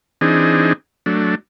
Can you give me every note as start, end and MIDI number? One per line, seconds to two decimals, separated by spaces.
0.21 0.73 52
0.21 0.73 60
0.21 0.73 62
0.21 0.73 63
0.21 0.73 68
1.06 1.35 54
1.06 1.35 57
1.06 1.35 62